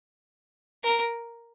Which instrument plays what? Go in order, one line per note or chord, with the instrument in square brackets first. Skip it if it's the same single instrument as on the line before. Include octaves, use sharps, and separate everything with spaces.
[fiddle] A#4